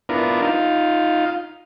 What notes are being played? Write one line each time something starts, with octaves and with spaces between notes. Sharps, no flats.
B3 D4 E4 F4 A#4
D#4 F4 F5